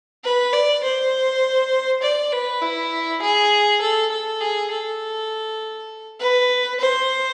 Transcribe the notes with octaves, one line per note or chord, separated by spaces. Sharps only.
B4
D5
C5
D5
B4
E4
G#4
A4
A4
G#4
A4
B4
C5